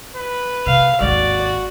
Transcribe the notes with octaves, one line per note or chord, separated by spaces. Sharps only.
B4
C3 F5
G#1 D#2 F#4 D5